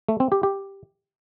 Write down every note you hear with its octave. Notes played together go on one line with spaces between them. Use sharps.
A3
C4
G4
G4